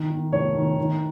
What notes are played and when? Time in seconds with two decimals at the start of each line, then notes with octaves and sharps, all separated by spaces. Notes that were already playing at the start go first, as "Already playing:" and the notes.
Already playing: D#3
0.10 D#3
0.32 F1 C#5
0.55 D#3
0.78 D#3